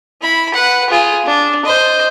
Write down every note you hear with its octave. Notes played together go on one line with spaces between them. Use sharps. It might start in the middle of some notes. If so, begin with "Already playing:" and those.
E4 B5
B4 F#5
F4 G#4
D4
C5 D#5